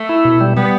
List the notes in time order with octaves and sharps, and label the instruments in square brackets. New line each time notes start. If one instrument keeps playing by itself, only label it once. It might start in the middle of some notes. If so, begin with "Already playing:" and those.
Already playing: [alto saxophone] A3
[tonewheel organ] E4
B2
G3
[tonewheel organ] G3 [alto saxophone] B3